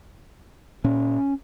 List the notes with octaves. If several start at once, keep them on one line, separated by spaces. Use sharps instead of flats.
A#2 C#4